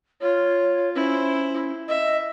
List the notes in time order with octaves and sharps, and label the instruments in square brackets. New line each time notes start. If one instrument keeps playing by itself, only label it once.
[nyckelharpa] F4 [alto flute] C#5
[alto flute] C#4 [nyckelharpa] E4 C5
[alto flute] D#5 [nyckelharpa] E5